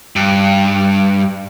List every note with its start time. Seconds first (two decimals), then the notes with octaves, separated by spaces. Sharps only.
0.16 G2